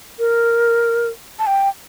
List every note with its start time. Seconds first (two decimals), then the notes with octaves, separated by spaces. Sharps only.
0.19 A#4
1.39 A5
1.47 G5